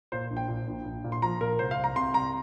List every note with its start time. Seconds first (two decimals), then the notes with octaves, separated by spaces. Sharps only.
0.12 A#2 C5
0.30 A#1
0.37 G5
0.48 A#2
0.67 A#1
0.85 A#1
1.04 A#2
1.12 C6
1.22 F3 A#5
1.41 A#2 A#4
1.59 C2 C5
1.71 F5
1.78 C2
1.84 A#5
1.96 C3 C6
2.14 C2 A#5